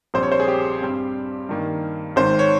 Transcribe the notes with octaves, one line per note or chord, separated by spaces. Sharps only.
A#1 A#2 G3 C4 C5
C#5
C5
G#4
G4
G2 G3 C4
G2 D#3 A#3
G#1 G#2 D#3 C5
C#5